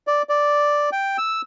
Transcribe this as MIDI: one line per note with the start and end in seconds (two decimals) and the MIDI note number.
0.07 0.22 74
0.29 0.90 74
0.92 1.17 79
1.18 1.42 88